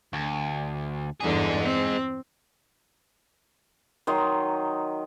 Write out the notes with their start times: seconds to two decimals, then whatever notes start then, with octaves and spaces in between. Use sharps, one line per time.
0.13 D2
1.20 E2 G2 D3 D#4 G#4
1.62 C4
4.07 D#3 F#3 D#5 C6